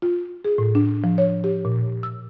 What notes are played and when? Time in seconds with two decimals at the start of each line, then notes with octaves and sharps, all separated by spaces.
0.02 F4
0.45 G#4
0.58 A2
0.75 D4
1.04 F3
1.18 C#5
1.44 G4
1.65 A#2
2.03 E6